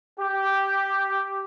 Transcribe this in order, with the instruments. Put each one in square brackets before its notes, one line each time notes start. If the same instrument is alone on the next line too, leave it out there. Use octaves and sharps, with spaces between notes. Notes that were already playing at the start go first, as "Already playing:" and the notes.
[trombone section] G4